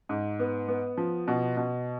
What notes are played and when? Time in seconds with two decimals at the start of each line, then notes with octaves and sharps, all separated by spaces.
0.09 G#2
0.39 B3
0.68 B3
0.97 F3
1.28 B2
1.57 B2